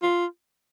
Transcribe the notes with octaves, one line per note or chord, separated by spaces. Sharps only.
F4